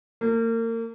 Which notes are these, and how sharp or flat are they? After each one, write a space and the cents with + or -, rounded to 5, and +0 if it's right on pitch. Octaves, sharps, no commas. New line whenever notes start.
A#3 -35